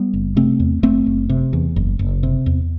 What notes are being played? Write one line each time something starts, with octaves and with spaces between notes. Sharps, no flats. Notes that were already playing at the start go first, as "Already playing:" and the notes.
Already playing: G3 B3
F#1
C3 A3 C4
E2
F#1 A3 C4
F#1
C3
E2
F#1
F#1
C3
E2